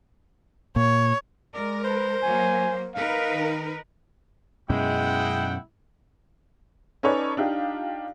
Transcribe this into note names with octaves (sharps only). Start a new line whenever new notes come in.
A#2 C#5
G#3 A#4 D5
B4 C5
F#3 A#3 G#5
D#4 A#4 B4 F5
D#3
F#2 B2 G#3 C#4 E4 F#5 G5
C#4 D#4 A4 B4 C#5 D5
D4 D#4 F4 G4